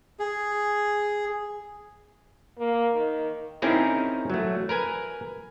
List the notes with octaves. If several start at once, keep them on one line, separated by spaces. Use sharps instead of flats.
G#4
A#3
D#3
C4 C#4 D#4 E4 G#4 A#4
F#3 A3
A#4 B4 G#5